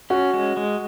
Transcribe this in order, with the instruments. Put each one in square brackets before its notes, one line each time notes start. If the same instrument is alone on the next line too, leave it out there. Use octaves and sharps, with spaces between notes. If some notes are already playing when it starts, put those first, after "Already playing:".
[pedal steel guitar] C#4 [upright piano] F#4
[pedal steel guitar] G#3
G#3